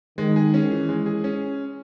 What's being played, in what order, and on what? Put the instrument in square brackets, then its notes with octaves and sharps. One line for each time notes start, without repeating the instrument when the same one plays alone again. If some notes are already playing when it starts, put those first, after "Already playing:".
[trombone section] D#3 [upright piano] G#3
[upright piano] G#4
C#4
E3
G#3
G#4
C#4